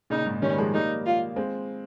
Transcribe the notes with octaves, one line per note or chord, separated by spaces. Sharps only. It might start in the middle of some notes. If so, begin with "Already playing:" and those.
A#2 C#3 D#4
G#2
D#3 G3 C#4
F3 G#3
G3 A#3 D#4
F4
G#3 C4